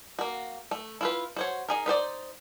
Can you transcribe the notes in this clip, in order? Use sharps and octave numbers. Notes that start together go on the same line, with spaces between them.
A#3 F#4
A3
E4 F4 B4
F#4 C5 C#5
D#4 G#4 A#4
D#4 B4 C5 D5